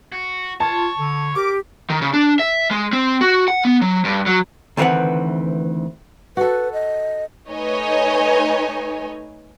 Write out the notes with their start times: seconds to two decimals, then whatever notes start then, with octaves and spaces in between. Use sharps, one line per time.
0.12 F#4
0.60 F4 C#5 A5
0.99 D3
1.36 G4 A#4 D6
1.90 D#3
2.02 C#3
2.14 D4
2.39 E5
2.71 G#3
2.93 C4
3.21 F#4
3.48 F#5
3.65 B3
3.82 F#3
4.05 G2
4.26 F#3
4.77 D2 D#3 E3 C4 B4 F#5
6.37 F#4 A4 B4
6.73 D#5
7.49 A3 D#4 B4 C#5 D#5 G#5